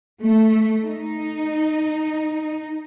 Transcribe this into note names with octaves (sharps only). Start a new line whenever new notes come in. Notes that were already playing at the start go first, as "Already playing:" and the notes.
A3
D#4